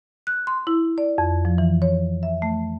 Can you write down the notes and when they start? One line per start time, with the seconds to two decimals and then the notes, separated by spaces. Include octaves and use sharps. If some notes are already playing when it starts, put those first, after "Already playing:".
0.27 F#6
0.47 C6
0.67 E4
0.98 D5
1.18 F2
1.45 F3
1.58 E3
1.82 C#5
2.23 E5
2.42 A3